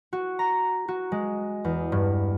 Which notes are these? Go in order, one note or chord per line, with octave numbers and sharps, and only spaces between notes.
F#4
A#5
F#4
G#3
E2
G2